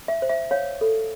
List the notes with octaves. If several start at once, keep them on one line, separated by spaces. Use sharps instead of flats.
E5
C5
E5
C#5 F5
A4